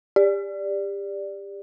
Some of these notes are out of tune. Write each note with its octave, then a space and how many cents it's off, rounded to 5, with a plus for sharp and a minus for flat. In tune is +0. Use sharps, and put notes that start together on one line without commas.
G4 +30 D5 +0